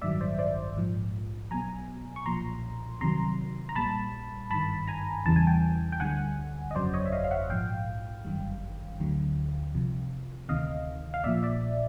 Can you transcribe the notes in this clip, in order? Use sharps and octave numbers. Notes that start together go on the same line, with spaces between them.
A1 G2 D#3 F#3 D5 E5
C5 D5
C5 D5
A#1 G#2 F3
B1 B2 F#3 G#5 A#5
C#6
B1 A#2 F3 A#5 C6
C2 C3 D#3 F#3 A#5 C6
A#5
A#1 A#2 G3 A5 B5
G#1 G2 D#3 A5 B5
G#5 A#5
E2 C#3 E3 G3 A5
G#5
G5 A5
G5
D2 D3 G3 F#5 G#5
D#5
G1 F2 C#3 F#3 C5 D5
C#5 D#5
E5
D#5 F5
F5
E5 F#5
A#1 G#2 F3 F5 G5
G1 F#2 D#3 G3
D2 D3 F#3
C2 C3 F3
D2 C3 D#3 D#5 F5
F5
A#1 A#2 F3 D5 E5
D5 E5